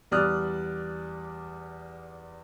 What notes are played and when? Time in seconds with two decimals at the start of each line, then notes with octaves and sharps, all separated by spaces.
0.11 E2 G3 D5 D#6 F6 F#6